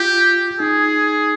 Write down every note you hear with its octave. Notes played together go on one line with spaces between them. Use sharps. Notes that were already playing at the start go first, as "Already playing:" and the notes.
Already playing: F4 G4
D#4 G#4